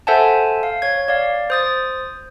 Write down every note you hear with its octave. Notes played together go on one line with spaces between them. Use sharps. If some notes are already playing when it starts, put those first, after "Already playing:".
A4 C5 E5 F#5 G#5 A5
F5
C#5 G#6
D5 F5
C5 D#6 A6